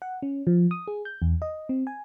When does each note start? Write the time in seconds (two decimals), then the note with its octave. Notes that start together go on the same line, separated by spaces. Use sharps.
0.02 F#5
0.22 C#4
0.47 F3
0.71 D#6
0.88 G#4
1.05 G6
1.22 E2
1.42 D#5
1.69 C4
1.87 G#5